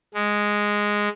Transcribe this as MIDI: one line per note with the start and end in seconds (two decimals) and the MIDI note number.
0.14 1.09 56